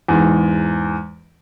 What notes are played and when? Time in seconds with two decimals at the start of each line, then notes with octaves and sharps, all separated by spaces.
0.08 E2 G#2